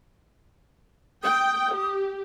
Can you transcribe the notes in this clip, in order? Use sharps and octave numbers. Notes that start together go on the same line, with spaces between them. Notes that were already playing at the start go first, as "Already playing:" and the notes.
G5 D#6
G4